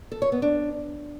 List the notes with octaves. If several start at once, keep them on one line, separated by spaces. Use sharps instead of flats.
A4
C#5
B3
D4